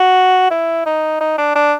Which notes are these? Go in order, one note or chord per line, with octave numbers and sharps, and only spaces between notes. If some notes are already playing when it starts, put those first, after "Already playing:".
Already playing: F#4
E4
D#4
D#4
D4
D4